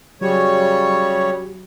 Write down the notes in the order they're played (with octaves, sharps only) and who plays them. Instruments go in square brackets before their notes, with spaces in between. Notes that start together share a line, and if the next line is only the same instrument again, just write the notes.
[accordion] C#3 G3 C#5 [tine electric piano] F#3 F#4 G4